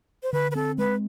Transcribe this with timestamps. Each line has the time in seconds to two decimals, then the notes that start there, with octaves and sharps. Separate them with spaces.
0.23 C5
0.33 D3 B4
0.51 B4
0.55 C4 A4
0.78 G#3 B4